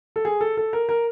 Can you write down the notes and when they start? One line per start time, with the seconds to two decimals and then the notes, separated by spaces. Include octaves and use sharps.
0.16 A4
0.25 G#4
0.41 A4
0.57 A4
0.73 A#4
0.89 A#4